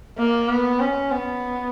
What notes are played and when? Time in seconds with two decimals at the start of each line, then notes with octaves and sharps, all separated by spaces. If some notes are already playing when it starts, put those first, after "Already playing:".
0.18 A#3
0.49 B3
0.80 C#4
1.11 B3